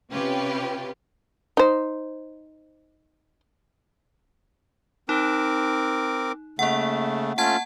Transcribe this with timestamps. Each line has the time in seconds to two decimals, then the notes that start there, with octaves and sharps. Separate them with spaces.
0.12 C3 C#4 F4 G4 B4
1.57 D#4 C5
5.09 C4 D#4 A#4 D6
6.59 C#3 A3 A#3 F#5
7.38 A3 C#4 F4 F#5 A5 G#6